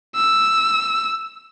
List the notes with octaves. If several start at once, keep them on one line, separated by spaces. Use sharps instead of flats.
E6